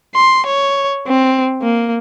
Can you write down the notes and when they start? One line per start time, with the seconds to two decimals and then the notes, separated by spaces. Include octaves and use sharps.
0.15 C6
0.47 C#5
1.07 C4
1.62 A#3